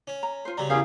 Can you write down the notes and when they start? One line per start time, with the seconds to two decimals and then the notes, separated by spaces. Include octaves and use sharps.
0.07 C#4
0.23 A#5
0.45 F4 C5
0.58 C#3 F#3 G3 A#5
0.70 E2 C#4 E4 G4 G#4 A#4 F5